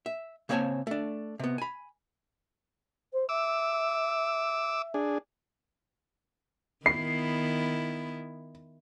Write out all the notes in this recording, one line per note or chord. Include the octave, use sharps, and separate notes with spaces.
E5
C#3 A#3 C4 C#5 G#5 A5
A3 D4
C3 B3
G#5 B5
C5
E5 D6 E6
D4 G#4
D#3 B3 E4 C7